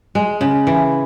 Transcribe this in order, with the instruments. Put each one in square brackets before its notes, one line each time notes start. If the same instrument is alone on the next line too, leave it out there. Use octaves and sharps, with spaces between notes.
[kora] G#3
C#3
E3